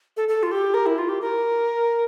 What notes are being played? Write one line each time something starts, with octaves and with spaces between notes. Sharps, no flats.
A4
A4
F4
G4
A#4
E4
F4
G4
A#4